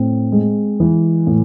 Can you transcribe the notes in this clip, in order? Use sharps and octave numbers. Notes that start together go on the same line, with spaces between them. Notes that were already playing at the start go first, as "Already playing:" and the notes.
Already playing: A2 C4
G#3
E3
A2